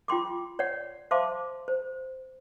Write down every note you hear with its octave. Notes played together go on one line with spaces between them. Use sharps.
F4 G5 C6 D6
C#5 D5 F#5
C5 E5 F5 A5 C6 D6
C5